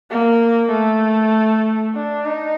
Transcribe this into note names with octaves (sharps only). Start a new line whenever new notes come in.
A#3
A3
D4
D#4